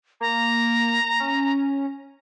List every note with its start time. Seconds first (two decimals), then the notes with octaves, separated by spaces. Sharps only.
0.21 A#3 A#5
1.20 C#4